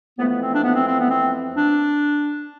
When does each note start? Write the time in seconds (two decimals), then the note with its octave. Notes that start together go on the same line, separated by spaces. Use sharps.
0.18 F2 E3 A3 B3
0.29 B3
0.41 C4
0.52 D4
0.63 B3
0.74 C4
0.86 C4
0.98 B3
1.10 C4
1.54 D4